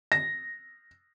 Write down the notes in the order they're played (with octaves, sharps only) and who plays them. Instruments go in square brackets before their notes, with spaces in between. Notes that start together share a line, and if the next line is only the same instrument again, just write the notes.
[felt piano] A#6